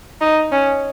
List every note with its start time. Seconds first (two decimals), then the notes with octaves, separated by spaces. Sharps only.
0.21 D#4
0.52 C#4